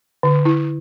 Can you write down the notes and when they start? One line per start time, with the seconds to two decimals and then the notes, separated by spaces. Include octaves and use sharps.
0.23 D3
0.45 E4